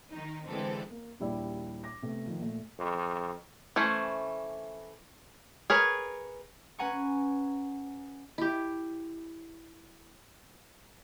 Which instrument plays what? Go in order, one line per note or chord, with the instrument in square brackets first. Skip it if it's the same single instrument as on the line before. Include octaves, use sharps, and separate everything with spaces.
[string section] D#3 D#4
D3 E3 G#3 C4 A4
[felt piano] A#3
A#1 D#2 G3 E4 D5
D6 A#6
C3 A3 B3
D#3 F3
A#2 A3
[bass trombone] F2
[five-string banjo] E3 A3 C#4 C5
G#4 A#4 B4 C#5
[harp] C#4 B4 F#5 G#5 A#5 C#6
[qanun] E4 G4